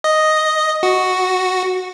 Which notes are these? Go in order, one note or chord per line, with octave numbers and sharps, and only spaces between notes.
D#5
F#4